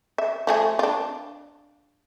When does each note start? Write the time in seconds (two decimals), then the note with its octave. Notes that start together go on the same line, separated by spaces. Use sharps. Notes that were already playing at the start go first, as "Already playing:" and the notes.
0.18 E5
0.47 F3 A3 G#4
0.79 D4 F4